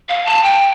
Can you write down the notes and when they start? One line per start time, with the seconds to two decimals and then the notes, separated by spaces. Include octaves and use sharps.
0.09 F5
0.26 A5
0.43 G5